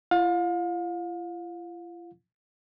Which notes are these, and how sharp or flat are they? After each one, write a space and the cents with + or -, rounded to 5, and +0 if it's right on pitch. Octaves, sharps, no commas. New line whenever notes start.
F4 -45 F5 +35